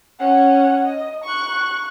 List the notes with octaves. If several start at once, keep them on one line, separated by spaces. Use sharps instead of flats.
C#4 F#5
D#5
C#6 F#6